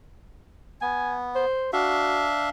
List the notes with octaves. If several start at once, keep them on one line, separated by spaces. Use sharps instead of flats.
B3 G#5
C5
D4 F#4 E5 F5